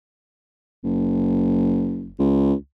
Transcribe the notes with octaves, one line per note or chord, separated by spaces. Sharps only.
F#1
C#2